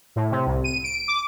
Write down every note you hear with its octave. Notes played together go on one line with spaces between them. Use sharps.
A2
C3
C2
D#7
D7
D6